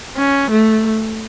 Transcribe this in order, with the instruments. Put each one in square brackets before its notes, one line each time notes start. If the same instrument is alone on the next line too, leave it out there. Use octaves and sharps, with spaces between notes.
[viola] C#4
A3